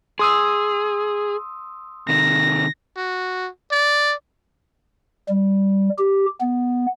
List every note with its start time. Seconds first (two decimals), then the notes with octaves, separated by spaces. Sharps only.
0.19 G#4 C6 D#6 E6
2.09 C3 D#3 A#6
2.96 F#4
3.71 D5
5.29 G3
5.98 G4
6.41 B3